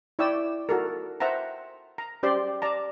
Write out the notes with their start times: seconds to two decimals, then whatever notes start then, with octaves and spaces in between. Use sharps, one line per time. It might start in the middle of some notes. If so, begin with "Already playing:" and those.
0.19 E4 C#5 D5 E5 G5 E6
0.69 F#4 A4 A#4
1.20 C5 E5 F#5 A5 A#5
1.98 A#5
2.23 C#4 G4 C5 D5 C6
2.62 D5 A5 A#5